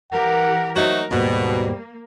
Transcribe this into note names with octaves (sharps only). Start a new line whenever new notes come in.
E3 G4 A#4 F#5
F#3 A3 D#4 F#4 A#4 C5 E5
D#2 G#2 B2 G3 A#3